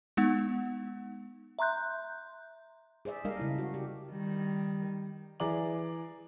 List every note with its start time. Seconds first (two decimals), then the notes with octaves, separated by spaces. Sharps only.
0.17 G#3 B3 D#4 F#5
1.59 E5 A#5 C6 F#6 G6
3.05 G#4 C5 D5 E5
3.24 G3 G#3 D4 A#4 D#5 F5
3.37 C#3 E4 F5
3.58 F#4
3.74 G4
4.11 D#3 G3
5.40 E3 G#4 D5 A#5 D6 F#7